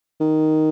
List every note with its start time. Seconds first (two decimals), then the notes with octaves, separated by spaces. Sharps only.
0.20 D#3